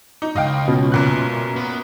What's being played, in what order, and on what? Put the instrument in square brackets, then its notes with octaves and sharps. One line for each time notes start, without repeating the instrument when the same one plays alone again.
[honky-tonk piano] D#4
[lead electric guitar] C#2 G2 [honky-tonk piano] D#5 F5 G5
[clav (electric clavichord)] B2 [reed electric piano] C#4 F4
[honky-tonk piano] F#2 A#2 F#6
[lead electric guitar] B3